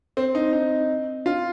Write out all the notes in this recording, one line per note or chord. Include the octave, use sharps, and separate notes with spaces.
C4
D#4
D#4
F4